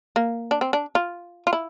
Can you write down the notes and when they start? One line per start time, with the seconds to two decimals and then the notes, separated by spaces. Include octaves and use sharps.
0.16 A#3
0.51 D4
0.61 C4
0.73 D4
0.95 F4
1.47 F4
1.53 E4